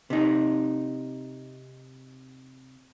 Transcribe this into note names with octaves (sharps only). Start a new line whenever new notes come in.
C3 D#4